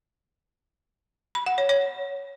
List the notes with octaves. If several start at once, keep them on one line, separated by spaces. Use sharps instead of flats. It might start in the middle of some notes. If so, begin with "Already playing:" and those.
B5
F#5
C#5
C#5